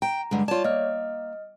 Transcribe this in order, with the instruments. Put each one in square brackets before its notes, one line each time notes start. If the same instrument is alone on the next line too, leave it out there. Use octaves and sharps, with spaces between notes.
[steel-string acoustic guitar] G5 [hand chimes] A#5
[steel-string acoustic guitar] G2 D3 G#3
[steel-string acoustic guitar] F4 A5 [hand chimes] C#5 D5
[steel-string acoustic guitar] A#3 [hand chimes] D#5 F6